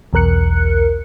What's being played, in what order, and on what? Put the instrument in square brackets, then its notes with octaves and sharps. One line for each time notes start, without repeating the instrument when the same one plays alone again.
[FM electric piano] B1 E2 A#4 F#6 C#7